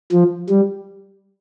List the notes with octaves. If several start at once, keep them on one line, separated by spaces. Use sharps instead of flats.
F3
G3